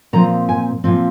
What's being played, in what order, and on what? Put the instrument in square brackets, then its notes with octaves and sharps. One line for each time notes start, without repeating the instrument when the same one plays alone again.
[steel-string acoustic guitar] A#2 F3 C4 A#5
G#5
A#2 F3 C4